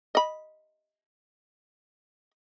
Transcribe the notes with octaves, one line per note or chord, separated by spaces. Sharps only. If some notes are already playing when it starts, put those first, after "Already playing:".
D#5 B5